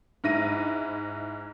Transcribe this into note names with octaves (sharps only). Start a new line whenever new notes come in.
G#2 E4 A#6 D#7